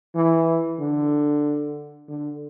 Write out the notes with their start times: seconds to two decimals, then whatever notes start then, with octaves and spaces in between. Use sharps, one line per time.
0.15 E3
0.80 D3
2.09 D3